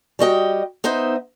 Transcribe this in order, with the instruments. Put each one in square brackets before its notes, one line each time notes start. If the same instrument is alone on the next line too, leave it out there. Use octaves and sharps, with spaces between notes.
[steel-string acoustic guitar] G3 F#4 D#5 G5
B3 D#4 C5 D#5 E5